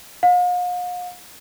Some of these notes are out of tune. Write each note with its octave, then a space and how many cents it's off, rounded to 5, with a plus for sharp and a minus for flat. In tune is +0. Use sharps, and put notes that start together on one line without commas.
F5 +45